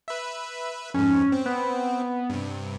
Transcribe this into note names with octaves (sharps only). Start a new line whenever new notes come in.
B4 E5
F2 G#2 C#4
C4
B3
G2 C3